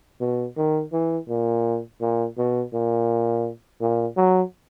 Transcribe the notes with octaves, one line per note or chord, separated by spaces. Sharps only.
B2
D#3
E3
A#2
A#2
B2
A#2
A#2
F#3